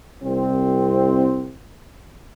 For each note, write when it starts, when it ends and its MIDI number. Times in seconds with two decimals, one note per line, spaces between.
0.23 1.54 36
0.23 1.54 60